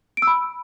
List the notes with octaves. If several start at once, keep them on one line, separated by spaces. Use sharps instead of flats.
D7
E6
B5